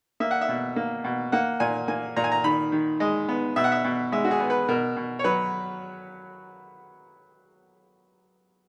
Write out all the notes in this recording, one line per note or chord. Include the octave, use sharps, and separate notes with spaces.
A#3 E5
F#5
E5
B2
A#3
B2
A#3 F#5
A#2 G#5
A#3 G#5
A#2 A#5
G#5
A#5
D#3 B5
D#3
G#3 D#5
B3
B2 E5
F#5
E5
B2
G#3 E5
F#4
G#4
B3
B4
B2 A#4
B2
C#5
F#3 B4